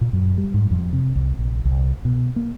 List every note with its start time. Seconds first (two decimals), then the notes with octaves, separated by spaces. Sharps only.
0.01 A#2
0.13 F#2
0.38 G3
0.54 G#2
0.71 F2
0.93 C3
1.16 C2
1.39 A#1
1.65 C2
2.05 B2
2.36 A#3